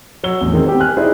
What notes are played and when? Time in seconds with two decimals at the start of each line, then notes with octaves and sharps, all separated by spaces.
0.23 F#3 C#5 E6 G7
0.41 A1 E2
0.53 D#3 G#3 C4
0.66 B3 G4 C5
0.80 G#5 F6 F#6
0.97 D#4 E4 G#4 C5 D5 D#5